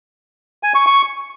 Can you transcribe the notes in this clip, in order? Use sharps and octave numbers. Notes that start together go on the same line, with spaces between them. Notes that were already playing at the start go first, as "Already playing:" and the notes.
G#5
C#6
C#6